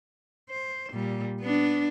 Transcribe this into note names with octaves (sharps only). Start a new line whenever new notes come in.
C5
A#2 G3
B3 D4